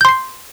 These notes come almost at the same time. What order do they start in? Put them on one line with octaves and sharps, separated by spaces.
G6 C6 C7